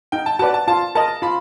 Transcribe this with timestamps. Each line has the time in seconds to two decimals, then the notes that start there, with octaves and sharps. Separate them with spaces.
0.12 D#4 G5
0.26 A5
0.39 F#4 B4 D5 A5
0.54 A5
0.68 F4 A5
0.95 A#4 D#5 A5
1.22 F4 B5